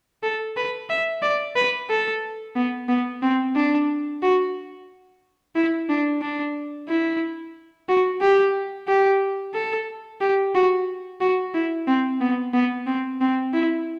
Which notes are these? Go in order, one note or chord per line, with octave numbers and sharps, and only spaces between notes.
A4
B4
E5
D5
B4
A4
B3
B3
C4
D4
F#4
E4
D4
D4
E4
F#4
G4
G4
A4
G4
F#4
F#4
E4
C4
B3
B3
C4
C4
E4